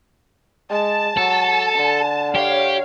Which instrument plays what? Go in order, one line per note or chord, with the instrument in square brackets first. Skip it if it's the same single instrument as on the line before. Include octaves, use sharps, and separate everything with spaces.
[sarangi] G#3 [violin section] A5
[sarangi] F#3 [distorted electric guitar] A4
[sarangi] D3
[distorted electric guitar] G4 [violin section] C#5 F5